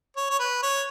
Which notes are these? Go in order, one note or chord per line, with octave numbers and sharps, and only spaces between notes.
C#5
C#5
B4
C#5